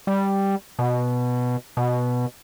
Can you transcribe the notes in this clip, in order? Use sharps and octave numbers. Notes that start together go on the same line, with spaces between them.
G3
B2
B2